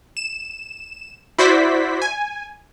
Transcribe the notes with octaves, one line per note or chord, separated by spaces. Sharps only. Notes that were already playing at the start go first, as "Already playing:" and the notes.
E7
E4 F#4 C5 D5 B6
G#5